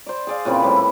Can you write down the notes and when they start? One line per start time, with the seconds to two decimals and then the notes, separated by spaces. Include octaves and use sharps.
0.06 C5 D5
0.27 G#4 D5 F5
0.45 A#2 C#3 E3 C4
0.62 A2 G3 B4
0.76 E4